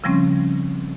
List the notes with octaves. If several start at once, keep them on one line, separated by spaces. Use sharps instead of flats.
C#3 F3 G3 A3 C4 C#4